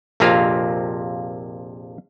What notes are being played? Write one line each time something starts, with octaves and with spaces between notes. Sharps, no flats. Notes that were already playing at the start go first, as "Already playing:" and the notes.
A#1 F2 C3 A#3 F4 F5